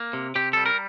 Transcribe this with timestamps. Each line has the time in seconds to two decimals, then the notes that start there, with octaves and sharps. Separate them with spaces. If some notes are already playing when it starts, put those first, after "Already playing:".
Already playing: A#3
0.13 C3
0.35 C3 G4
0.53 G3 A4
0.66 A#4